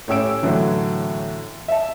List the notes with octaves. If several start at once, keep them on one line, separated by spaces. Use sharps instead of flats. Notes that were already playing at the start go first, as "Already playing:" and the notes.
A2 C#4 G4 E6 D7
A2 D3 E3 F#3
E5 A5